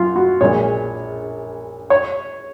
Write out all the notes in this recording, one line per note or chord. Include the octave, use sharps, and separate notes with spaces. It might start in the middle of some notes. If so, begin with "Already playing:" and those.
Already playing: F#2 F4
F#4
A#1 A#2 G#3 C#5
C#5